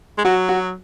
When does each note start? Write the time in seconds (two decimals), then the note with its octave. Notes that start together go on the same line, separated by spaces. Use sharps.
0.18 G#3
0.25 F#3 F#4
0.49 F#4